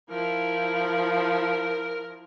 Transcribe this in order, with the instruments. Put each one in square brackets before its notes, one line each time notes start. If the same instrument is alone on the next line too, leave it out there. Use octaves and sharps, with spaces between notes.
[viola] F3 E4 [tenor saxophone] A#4